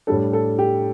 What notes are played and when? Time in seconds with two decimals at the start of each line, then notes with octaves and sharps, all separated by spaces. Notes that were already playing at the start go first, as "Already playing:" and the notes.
0.07 A2 G3 D4 A4
0.33 A4
0.59 G4